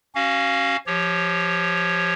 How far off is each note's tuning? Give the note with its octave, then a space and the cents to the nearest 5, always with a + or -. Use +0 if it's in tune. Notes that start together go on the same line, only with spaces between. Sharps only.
C#4 -15 F#4 +20 F5 +0
F3 -10 G4 +0 C#5 +0